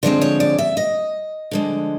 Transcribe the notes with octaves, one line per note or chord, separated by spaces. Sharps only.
D3 F3 G#3 C4 C5
C#5
D5
E5
D#5
D3 F3 G#3